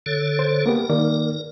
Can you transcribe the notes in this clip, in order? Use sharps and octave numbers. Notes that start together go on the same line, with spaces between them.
D3 A4 C#5
C5
A#3 B3 G4 A#4
D#3 A#3 D5